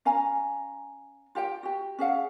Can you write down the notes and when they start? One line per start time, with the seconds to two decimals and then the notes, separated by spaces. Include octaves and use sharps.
0.05 C#4 F5 G#5 A#5
1.35 F4 G4 F#5 G5
1.63 F#4 G4
1.99 C#4 G#4 F5 F#5